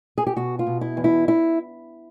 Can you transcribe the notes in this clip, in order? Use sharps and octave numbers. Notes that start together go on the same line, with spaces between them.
G#4
G4
B2 F#4
F4
B2
E4
E2
E4
E4